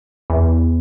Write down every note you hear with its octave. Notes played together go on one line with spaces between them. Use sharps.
E2